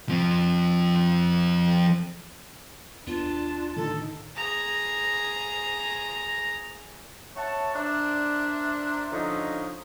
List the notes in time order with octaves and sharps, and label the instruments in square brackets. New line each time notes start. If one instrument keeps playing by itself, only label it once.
[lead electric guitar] F3 C4
[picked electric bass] D#2 B3 [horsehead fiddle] D4 A5 [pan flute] F4
[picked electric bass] A2 D3 D#3 [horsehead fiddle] D#4 [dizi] A4
[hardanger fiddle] G#4 A#5
[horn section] C#5 E5 F#5 A5
D4 A#4 C5 D5 E5
D3 F3 C#4 D#4